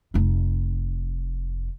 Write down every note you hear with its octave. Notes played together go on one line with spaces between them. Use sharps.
F1 D#4